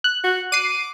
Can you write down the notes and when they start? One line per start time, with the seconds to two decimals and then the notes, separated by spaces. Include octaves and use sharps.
0.04 F#6
0.24 F#4
0.52 D6 C7 D#7